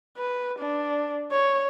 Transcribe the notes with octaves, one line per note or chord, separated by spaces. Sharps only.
B4
D4
C#5